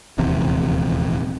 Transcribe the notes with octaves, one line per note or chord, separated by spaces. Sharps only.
D#1 A#1 E2 C3